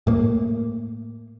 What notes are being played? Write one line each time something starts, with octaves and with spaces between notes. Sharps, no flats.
A2 A#3